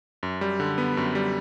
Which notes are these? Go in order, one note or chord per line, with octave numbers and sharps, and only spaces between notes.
F#2
G3
D3
B3
F#2
G3